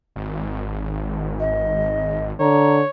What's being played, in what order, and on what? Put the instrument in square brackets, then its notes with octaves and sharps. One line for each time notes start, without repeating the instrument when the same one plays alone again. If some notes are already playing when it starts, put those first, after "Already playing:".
[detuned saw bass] G#1
[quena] D#5
[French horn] D3 [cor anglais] C#5 [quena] A#5